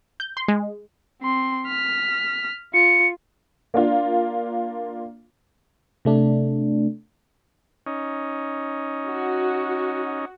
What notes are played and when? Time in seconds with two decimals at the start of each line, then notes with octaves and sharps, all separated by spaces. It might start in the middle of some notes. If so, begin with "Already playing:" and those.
0.20 G6
0.37 C6
0.48 G#3
1.22 C4 C6
1.67 F6 B6
2.74 F4 C#7
3.74 A#3 D4 F4
6.05 C3 A3 D4
7.86 C#4 D#4
9.07 F#4